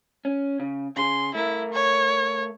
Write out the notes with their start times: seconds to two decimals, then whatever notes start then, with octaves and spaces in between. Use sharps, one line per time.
0.25 C#4
0.60 C#3
0.97 C#3 G#4 C6
1.35 A3 E4 A#4
1.73 C#5